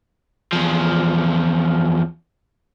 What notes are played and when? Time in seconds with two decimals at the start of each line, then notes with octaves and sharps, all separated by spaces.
0.53 E2 F3